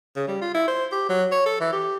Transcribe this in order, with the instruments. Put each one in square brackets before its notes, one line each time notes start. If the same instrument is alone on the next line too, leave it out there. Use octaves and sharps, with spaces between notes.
[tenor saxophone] C#3
G3
F4
E4
C5
G4
F#3
C#5
A4
E3
G4